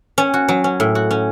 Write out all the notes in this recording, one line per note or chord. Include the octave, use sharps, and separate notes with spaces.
C#4
F#4
F#3
C#4
A2
F#4
C#4